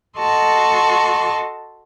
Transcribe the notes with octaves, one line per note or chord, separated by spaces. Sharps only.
F#4 A4 D#5 A5 C6 C#6